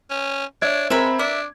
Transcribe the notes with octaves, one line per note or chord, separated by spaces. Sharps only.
C#4
D4 C#5 E5 G#6
G#3 C4 A#4 B4 E5 B5
D4 E5 D6